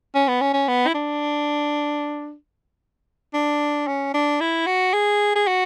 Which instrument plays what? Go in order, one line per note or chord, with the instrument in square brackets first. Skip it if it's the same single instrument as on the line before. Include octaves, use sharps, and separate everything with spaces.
[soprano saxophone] C#4
B3
C#4
C#4
B3
E4
D4
D4
C#4
D4
E4
F#4
G#4
G#4
F#4